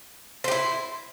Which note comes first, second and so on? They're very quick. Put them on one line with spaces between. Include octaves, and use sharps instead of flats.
C5 G4 E4